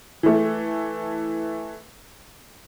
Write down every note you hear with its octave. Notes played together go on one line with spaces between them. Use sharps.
E3 A3